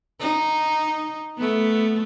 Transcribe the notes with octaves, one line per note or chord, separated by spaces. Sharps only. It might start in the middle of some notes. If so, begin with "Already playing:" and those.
D#4
A3 B3